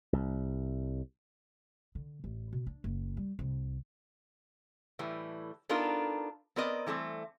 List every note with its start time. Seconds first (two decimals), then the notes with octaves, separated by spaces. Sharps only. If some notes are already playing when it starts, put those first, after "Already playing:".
0.13 C2
1.95 D3
2.24 A1
2.53 B2
2.66 D4
2.84 F#1
3.17 G3
3.39 C2
4.99 A2 E3 G3
5.69 B3 D4 D#4 F4 A4 A#4
6.56 B3 C4 A#4 D5 D#5
6.87 E3 G3 A3 C4